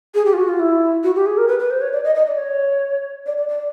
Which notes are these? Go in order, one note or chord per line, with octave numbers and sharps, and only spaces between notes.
G#4
G4
F4
F#4
F4
E4
F#4
G4
G#4
A#4
B4
B4
C5
C#5
D5
D#5
D#5
D5
C#5
D5
D5
D5